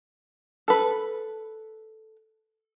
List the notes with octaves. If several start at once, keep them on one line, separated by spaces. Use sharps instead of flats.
A4 B4